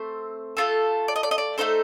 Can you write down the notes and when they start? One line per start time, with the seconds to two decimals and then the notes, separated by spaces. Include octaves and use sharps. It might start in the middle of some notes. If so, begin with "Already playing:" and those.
Already playing: A3 C4 C5
0.57 A3 C4 F4 A4
1.08 D5
1.16 D#5
1.23 D5
1.31 D#5
1.38 D5
1.58 A3 C4 D#4 A4 C5